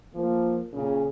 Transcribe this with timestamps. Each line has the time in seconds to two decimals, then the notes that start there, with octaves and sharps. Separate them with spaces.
0.14 F3 A#3
0.73 A#2 C#3